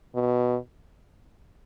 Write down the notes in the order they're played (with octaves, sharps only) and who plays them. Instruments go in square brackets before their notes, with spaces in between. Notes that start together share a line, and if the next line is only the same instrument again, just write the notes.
[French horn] B2